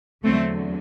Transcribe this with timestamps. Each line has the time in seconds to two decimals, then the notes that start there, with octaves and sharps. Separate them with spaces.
0.24 E2 D3 F#3 A3 C4